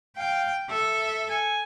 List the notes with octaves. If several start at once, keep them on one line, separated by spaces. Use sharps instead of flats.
F5 G5
A4 E5
G#5